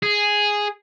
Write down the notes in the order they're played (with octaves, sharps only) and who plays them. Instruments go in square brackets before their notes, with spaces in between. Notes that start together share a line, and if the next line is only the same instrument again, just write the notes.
[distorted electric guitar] G#4